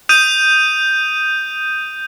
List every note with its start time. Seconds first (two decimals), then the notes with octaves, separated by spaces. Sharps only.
0.09 D#6 G6 D#7